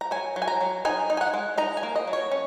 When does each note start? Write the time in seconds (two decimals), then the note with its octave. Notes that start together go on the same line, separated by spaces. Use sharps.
0.01 A#5
0.11 F#3 G#5
0.36 F#3
0.42 G#5
0.48 A#5
0.61 F#3
0.85 D#4 G#5
1.10 D#4
1.17 G#5
1.21 F#5
1.34 G#3
1.58 D#4 A#5
1.77 G#5
1.83 A#3
1.96 D#5
2.08 F#3
2.13 C#5
2.31 C#4